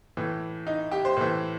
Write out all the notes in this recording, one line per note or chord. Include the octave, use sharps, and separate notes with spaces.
A2 E3
D#4
G4
C5
A2 E3